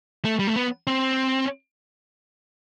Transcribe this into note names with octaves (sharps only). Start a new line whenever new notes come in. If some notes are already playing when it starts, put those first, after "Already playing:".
A3
G3
A3
B3
C4